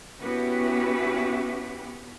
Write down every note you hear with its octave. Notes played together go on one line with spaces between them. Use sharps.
B3 C#4 E4 F#4 G4 B4